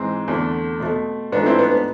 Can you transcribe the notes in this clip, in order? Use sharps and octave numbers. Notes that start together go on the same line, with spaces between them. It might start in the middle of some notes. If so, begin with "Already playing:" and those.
Already playing: G#2 E3 G#3 C4
E2 D3 A3
B2 A3
G#2 F3 A3 B3 D4
C4 E4
B3 D4
B3